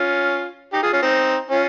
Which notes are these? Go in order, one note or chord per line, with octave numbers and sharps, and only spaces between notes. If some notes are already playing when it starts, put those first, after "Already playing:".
Already playing: C#4 F4
D#4 G4
F4 G#4
C#4 F4
C4 D#4
C#4 F4